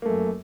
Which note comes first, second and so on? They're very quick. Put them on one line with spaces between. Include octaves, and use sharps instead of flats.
A#3 A3 F#2